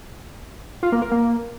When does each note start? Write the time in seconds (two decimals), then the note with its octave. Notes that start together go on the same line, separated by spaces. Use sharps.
0.83 F4
0.92 A#3
1.02 A#4
1.12 A#3